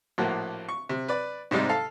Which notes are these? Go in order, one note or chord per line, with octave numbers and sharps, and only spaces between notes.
A#1 A2 F3 A#3 F#4
C#6
C3
B4 D5
G#2 C3 G3 G#3 D#4
A4 F5 A5